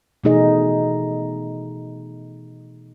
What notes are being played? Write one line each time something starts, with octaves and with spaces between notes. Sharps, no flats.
B2 E3 A3 D#4 G#4 D#5